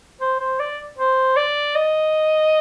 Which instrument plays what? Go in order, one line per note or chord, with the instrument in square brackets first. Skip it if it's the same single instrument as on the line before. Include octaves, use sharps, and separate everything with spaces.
[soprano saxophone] C5
C5
D5
C5
D5
D#5